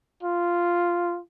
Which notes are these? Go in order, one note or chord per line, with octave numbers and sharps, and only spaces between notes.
F4